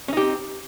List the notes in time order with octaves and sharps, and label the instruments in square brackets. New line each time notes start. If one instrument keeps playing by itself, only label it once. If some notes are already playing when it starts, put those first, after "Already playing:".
[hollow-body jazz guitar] C#4
D#4
G4
C4